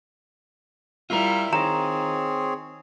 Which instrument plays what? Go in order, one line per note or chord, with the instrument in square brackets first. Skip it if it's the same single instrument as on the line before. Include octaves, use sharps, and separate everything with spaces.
[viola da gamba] G3 E4 [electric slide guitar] F4 A#4 [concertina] E5
[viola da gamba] D#3 [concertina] C4 G#4 C#5 [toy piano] A#5